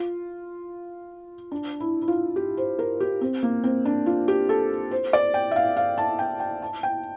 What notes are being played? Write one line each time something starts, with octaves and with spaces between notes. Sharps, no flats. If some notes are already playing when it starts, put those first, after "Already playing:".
Already playing: F4
D4
E4
E4
F4
G4
C5
A#4
G4
C4
A#3
C4
D4
F4
G4
A4
C5
D5
G5
E5
F5
F5
A5
G5
G5
A5
G5